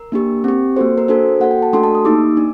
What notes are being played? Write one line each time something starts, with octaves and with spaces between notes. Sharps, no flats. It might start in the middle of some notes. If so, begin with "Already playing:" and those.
Already playing: A#4
A#3 D4 G4
C4 G4
A#3 F#4 A4 C5
A#4
D4 F#4 A4 C5
A#3 F#4 A4 F#5
G5
A5
A3 D4 F#4 A4 C6
A5
D#6
A#3 D#4 G4 D6
D4